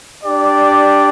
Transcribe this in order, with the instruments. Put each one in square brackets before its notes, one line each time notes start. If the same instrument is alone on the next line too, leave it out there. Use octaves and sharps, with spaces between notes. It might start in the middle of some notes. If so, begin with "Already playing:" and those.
[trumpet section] D4 G4 D5